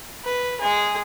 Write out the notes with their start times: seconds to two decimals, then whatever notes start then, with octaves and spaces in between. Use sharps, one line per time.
0.25 B4
0.60 G#3 G#4